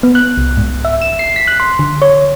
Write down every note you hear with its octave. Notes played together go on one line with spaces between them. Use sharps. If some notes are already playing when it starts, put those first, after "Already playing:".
B3
F#6
C2
G#2
E5
E7
C7
B6
F#6
C6
D3
C#5